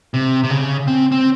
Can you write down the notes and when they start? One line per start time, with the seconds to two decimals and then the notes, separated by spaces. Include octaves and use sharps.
0.14 C3
0.44 C3
0.50 C#3
0.88 C4
1.12 C4